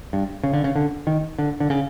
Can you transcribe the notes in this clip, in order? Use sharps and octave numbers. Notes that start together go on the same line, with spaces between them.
G2
C#3
D3
C#3
D3
D#3
D3
D3
C#3